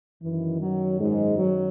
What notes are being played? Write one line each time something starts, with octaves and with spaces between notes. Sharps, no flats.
F#2 D#3 E3
F#3
G#2 G#3
F#3